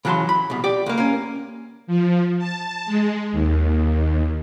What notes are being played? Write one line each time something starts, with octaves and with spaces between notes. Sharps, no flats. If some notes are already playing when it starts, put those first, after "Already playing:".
C#3 E3 F#3 E5 A5 C6
B5
C2 B2
G4 D5
C#2 A#3
A#3 C#4
F3
A5
G#3
D#2